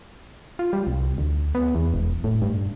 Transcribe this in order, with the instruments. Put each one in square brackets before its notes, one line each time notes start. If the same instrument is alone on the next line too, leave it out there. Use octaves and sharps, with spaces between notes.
[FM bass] F4
G3
C2
D2
B3
E2
E1
A2
G2